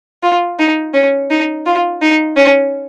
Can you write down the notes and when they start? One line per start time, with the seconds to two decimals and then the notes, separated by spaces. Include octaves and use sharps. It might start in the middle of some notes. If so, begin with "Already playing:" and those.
0.23 F4
0.59 D#4
0.94 C#4
1.31 D#4
1.66 F4
2.02 D#4
2.37 C#4